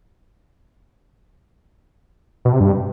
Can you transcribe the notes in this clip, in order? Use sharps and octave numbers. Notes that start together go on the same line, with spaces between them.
B2
C3
G2